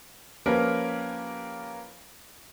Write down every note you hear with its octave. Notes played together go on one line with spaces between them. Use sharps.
F3 A#3 C#4 G4 A#4 B4